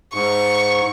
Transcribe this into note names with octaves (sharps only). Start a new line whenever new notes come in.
G#2 C#6